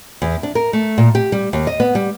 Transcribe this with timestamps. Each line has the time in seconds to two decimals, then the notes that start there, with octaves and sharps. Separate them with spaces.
0.22 E2
0.43 D4
0.55 A#4
0.73 A3
0.98 A#2
1.15 G4
1.32 G3
1.53 D#2
1.67 D#5
1.80 B3
1.95 G3